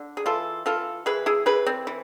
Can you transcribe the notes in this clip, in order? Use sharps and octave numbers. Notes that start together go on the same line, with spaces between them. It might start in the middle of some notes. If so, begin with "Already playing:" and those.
Already playing: D3
G#4
E3 F4 A4
E3 F4 A4
E3 G#4 B4
E4 G#4
E3 G#4 B4
C4
E3